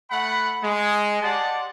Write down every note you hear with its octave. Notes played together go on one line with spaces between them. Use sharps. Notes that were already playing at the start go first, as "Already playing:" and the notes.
A3 F#5 B5
G#3
G4 D5 D#5 F#5 A5 C6